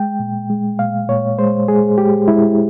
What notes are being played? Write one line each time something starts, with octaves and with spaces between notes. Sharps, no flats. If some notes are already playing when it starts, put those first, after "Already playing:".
Already playing: G#3 G5
A#2
G#3
A#2 F5
A#2 C#5
G#3 C5
G#3 G#4
G#3 G4
G#3 E4